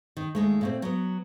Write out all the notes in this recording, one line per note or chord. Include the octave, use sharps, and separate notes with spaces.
D#3
D#2 G#3 A3
A#2 A3 C4
F#3 B3